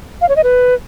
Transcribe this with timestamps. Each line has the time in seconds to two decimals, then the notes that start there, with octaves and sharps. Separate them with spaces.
0.21 F5
0.29 C#5
0.36 D#5
0.44 B4